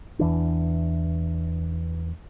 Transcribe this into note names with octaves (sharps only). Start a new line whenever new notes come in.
E2 E3 D4